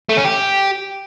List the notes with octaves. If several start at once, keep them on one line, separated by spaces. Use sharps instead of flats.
A3
C#4
G4